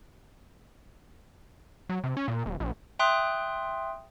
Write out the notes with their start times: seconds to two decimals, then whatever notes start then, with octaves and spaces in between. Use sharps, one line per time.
1.89 F#3
2.04 C3
2.17 C#4
2.28 A#2
2.46 D#1
2.60 A#1
2.99 E5 G5 C6 D#6 F#6